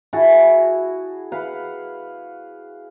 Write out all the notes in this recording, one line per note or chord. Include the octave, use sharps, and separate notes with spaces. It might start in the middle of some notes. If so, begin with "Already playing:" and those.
E4 F#4 G#4 A5
B4 F5 F#5 B5